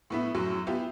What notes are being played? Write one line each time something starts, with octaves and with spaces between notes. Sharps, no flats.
A2 B3 E4
F#2 A2 F#3
B3 E4 F4 G4